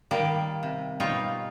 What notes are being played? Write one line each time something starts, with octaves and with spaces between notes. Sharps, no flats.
D#3 G3 A#3 D5
C3
B2 G3 D#4 F4 C#5